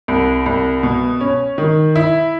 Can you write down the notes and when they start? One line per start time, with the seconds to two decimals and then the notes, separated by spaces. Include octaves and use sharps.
0.08 C2
0.46 C2
0.83 B2
1.21 C#4
1.58 D#3
1.96 E4